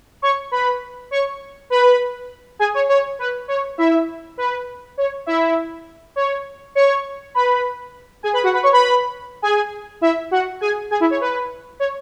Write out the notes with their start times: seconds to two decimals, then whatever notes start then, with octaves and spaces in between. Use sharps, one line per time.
0.22 C#5 C#6
0.51 B4 B5
1.11 C#5 C#6
1.70 B4 B5
2.59 G#4 G#5
2.74 C#5
2.89 C#5
3.19 B4
3.48 C#5
3.78 E4 E5
4.38 B4
4.98 C#5
5.26 E4 E5
6.16 C#5
6.75 C#5 C#6
7.35 B4 B5
8.23 G#4 G#5
8.33 B4 B5
8.43 F#4 F#5
8.54 B4 B5
8.63 C#5 C#6
8.72 B4 B5
9.42 G#4 G#5
10.01 E4 E5
10.31 F#4 F#5
10.61 G#4 G#5
10.91 G#4 G#5
11.00 E4 E5
11.10 C#5
11.21 B4
11.80 C#5